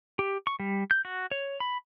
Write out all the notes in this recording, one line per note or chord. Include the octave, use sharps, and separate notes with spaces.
G4
C#6
G3
G6
F#4
C#5
B5